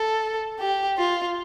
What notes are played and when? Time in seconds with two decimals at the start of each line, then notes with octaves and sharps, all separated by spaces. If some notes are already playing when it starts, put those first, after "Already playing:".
Already playing: A4
0.59 G4
0.98 F4